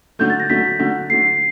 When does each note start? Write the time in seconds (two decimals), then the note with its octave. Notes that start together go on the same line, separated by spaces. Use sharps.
0.19 D3 F#3 A3 G6
0.30 A6
0.40 A#6
0.49 D3 F#3 A3 B6
0.79 D3 F#3 A3
1.10 D3 F#3 A3 C7